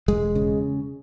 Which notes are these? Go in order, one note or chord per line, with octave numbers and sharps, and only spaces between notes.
E1 G#3
C#3